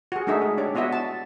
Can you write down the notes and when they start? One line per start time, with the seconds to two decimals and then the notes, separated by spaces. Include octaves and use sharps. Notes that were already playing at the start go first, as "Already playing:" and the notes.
0.12 F#4 G#4
0.27 G#3 A3 D4 D#4 G#4 E5
0.42 G#4
0.58 D4 G4 C#5
0.75 B3 E4 F#4 D#5 E5
0.93 A5